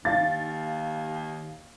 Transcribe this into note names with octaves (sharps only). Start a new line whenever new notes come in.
D#2 F5 A6